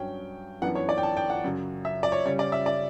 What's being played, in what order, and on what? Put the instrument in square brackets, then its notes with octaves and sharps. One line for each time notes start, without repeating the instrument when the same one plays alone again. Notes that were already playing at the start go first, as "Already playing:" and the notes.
Already playing: [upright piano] G2 F#3 C#4 G5
F#2 E3 B3 D4 F#5
C#5
D5
G5
A5
G5
F#5
F#2 C#3 F#3
E5
D5
C#5
C#3 G3 C#4 C#5
D5
E5
D5